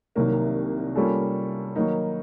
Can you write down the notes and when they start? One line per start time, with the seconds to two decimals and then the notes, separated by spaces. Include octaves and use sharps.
0.15 C2 C3 D#3 F#3 A#3
0.95 G3 A#3 C#4 F4 A4
1.76 D#3 F#3 A#3 D#4